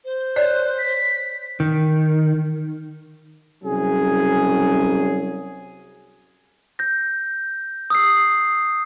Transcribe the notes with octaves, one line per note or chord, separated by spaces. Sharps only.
C5
C#5 D5 F#6
B6
D#3
C2 F#3 C#4 G#4
G6 A#6
D#6 E6 C7